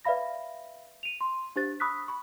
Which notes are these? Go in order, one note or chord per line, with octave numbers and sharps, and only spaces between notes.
B4 D5 E5 F5 B5 A#6
D#7 F7
C6
D4 G4 C5 A6
B5 C#6 D#6 E6 F#6 B6
B5 C#6